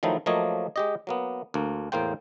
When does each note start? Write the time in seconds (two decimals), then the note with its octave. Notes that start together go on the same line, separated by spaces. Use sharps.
0.03 D#3 F3 F#3 A3 D#4 E4
0.26 F3 F#3 A3 A#3 C#5 D#5
0.76 G#3 G4 D#5
1.07 F#3 A#3 B3
1.54 D2 A#3
1.92 E2 A2 A#3 C5 G5